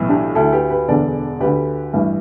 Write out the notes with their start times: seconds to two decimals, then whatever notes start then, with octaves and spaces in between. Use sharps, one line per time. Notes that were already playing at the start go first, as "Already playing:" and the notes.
Already playing: B1 A2 E3
0.09 D4 G4
0.35 D2 D3 E4 A4
0.52 G4 B4
0.70 G4 B4
0.88 E1 E2 D3 A4 D5
1.40 D2 D3 G4 B4
1.93 A1 G2 E3